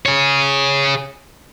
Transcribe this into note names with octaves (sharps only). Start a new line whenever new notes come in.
G#4 C#5